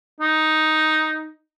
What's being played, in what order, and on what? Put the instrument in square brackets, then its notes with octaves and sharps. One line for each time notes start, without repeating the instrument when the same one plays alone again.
[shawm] D#4